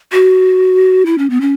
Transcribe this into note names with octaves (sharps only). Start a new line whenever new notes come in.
F#4
E4
C#4
B3
C#4